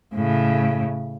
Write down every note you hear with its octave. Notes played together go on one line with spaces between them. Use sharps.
A2 C#3